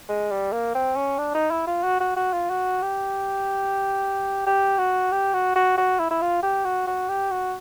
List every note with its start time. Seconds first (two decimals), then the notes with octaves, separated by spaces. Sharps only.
0.09 G#3
0.31 G3
0.52 A#3
0.75 C4
0.96 C#4
1.18 D4
1.34 D#4
1.51 E4
1.67 F4
1.83 F#4
2.00 F#4
2.16 F#4
2.33 F4
2.50 F#4
2.82 G4
4.46 G4
4.78 F#4
5.12 G4
5.33 F#4
5.55 F#4
5.77 F#4
5.99 E4
6.10 E4
6.21 F4
6.43 G4
6.65 F#4
6.87 F#4
7.08 G4
7.31 F#4